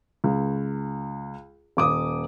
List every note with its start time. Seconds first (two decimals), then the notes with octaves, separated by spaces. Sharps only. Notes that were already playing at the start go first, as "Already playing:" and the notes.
0.24 C#2
1.77 D#1 D6 D#6